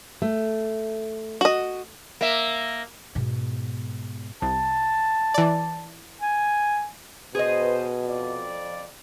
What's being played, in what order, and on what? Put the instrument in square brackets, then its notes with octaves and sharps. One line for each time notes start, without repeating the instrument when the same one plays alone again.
[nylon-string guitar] A3
[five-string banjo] F#4 D#5
[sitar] A#3 E5
[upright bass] G#2 B2
[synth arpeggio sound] C2 [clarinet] A5
[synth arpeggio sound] E3 D5
[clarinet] G#5
[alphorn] B2 [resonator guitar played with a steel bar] G#4 D#5 [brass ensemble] B4 C5
[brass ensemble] F2 D5